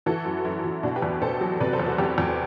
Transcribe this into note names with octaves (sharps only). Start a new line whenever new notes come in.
E3 F#4 A4
F#2
F#2 E4
E3
B2 D4 F#4
G4 B4
E2
B2 A4 C5
F#3
C3 B4 D5
A4 C5
E2
F#4 A4
E2 G4 B4
E2